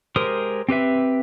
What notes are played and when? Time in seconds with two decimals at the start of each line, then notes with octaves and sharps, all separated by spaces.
0.16 G#3 G4 A#4 C5 D#6
0.69 C4 G4 B4 E5